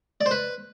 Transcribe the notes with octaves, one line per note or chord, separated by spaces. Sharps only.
D5
C5
B4